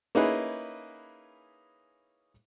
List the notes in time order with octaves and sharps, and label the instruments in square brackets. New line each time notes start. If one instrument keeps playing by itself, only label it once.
[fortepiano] A#3 C#4 D#4 E4 G#4 B4